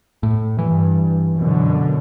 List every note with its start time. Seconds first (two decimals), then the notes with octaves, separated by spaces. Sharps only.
0.23 A2
0.58 G2 E3
1.35 F#2 B2 D3